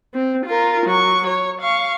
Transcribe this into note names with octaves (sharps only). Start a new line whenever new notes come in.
C4
F4 A#4
F#3 C#6
C#5
F5 C#6